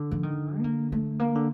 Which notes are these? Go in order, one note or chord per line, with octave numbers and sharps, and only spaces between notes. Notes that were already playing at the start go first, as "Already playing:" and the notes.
Already playing: D3
F3
D#3
C4
A#3
A3
A#3
D3